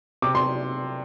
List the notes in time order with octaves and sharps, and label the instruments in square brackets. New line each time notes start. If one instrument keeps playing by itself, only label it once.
[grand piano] C3 [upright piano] D6
[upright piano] C6